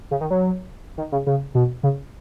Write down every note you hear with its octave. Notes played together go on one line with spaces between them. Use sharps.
C#3
D#3
F#3
D#3
C#3
C#3
B2
C#3